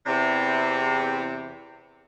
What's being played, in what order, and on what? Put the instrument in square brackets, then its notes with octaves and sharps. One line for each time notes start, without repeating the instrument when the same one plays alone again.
[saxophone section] E2 C3